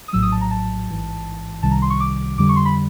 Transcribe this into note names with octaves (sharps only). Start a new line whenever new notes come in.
D#6
A#1 A2 F#3 E6
D#6
A5
A#5
A5
A1 G#2 E3
C2 C3 D#3 G3 A5
A#5
C6
C#6
D6
F2 D3 G3 D6
C#6
C6
B5